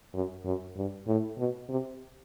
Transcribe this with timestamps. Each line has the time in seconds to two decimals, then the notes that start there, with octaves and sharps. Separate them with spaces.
0.14 F#2
0.44 F#2
0.76 G2
1.07 A2
1.38 B2
1.69 C3